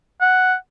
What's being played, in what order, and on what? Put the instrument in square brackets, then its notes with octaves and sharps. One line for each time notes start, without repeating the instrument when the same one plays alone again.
[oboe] F#5